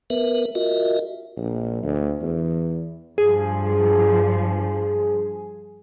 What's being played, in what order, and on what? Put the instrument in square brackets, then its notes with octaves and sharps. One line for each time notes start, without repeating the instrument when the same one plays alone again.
[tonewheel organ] B3 A#4 B4 E5
F4 F#4 A#4 D#5 E5
[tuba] A#1
D2
E2
[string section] G2 F3 [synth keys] G#4